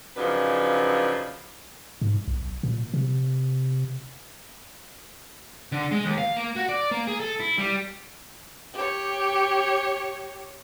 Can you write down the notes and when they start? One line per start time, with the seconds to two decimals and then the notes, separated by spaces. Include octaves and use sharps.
0.17 F#2 C#3 F3 D4 D#4 B4
2.02 G#2
2.28 B1
2.63 A#2
2.94 C3
5.72 D3
5.91 G#3
6.05 D#2
6.18 F5
6.36 A#3
6.56 F#4
6.69 D5
6.91 A#3
7.07 G#4
7.20 A4
7.40 E4
7.58 G3
8.74 G4 C#5